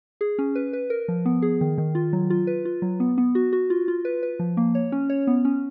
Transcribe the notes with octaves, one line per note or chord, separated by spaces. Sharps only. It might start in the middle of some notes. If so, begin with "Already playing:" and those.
G#4
C#4
B4
B4
A#4
F3
B3
G#4
D#3
D#3
F4
F#3
F4
B4
F4
F#3
B3
B3
F#4
F#4
F4
F4
B4
B4
F3
A#3
C#5
C#4
C#5
B3
C#4